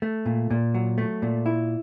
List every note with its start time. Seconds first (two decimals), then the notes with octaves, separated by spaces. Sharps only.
0.02 A3
0.26 A#2
0.51 A#2
0.74 F#3
0.98 A3
1.22 A#2
1.46 E4